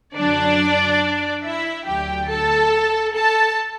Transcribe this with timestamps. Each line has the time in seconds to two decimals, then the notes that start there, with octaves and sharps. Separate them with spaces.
0.17 F#2 D3 F#3 D4 D5
1.44 E4 E5
1.87 D2 D3 F#3 G4 G5
2.29 A4 A5
3.14 A4 A5